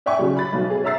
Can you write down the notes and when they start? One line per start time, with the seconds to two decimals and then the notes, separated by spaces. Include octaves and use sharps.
0.06 D5 E5 G5 G#5 C#6 D6
0.19 C#3 F#3
0.37 B5 A6
0.53 B1 B2
0.70 G#4
0.84 C#5 E5 A#5 E6 A6 C7